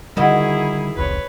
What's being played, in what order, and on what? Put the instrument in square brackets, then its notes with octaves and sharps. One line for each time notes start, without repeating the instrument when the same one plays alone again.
[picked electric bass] D3 G3 [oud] D#3 F#4 D#5 [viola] E4 G#4
[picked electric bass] E1 C2 [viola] B4 C#5